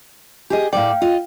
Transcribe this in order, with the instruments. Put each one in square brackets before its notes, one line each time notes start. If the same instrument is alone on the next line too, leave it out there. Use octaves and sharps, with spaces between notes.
[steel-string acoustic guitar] G4 G#4 D#5
[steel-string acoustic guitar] A2 F#3 D5 [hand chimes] F5 G5
[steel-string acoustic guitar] F4 D#5